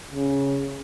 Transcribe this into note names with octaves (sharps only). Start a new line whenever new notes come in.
C#3